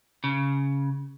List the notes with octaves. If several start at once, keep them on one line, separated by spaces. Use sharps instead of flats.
C#3